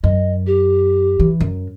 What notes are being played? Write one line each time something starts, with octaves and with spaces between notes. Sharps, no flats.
F#2 D#5
G4
E3
F#2